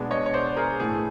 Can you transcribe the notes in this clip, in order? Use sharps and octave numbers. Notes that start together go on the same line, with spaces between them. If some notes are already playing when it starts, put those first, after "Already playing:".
Already playing: B2 G#3 B3 D4
C#5 D#5
C#5
C5 D5
G#4 A#4
A2 E3 A3 G#4